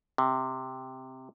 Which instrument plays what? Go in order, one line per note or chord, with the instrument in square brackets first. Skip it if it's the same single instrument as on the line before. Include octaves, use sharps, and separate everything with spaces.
[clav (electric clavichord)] C3